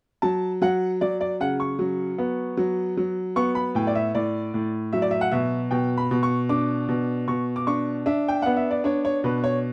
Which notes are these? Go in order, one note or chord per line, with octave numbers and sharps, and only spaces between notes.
F#3 A5
F#3 F#5
F#3 D5
D5
C#3 F#5
C#6
F#3
B3
F#3
F#3
B3 C#6
B5
A2 G5
D5
E5
A2 D5
A2
F#3 E5
D5
E5
F#5
B2 E5
B2 G5
B5
B2
C#6
D4 D6
B2
B2 C#6
D6
D4 C#6
D4 E5
G5
B3 F#5
E5
D5
D4 C#5
C#5
B2 B4
C#5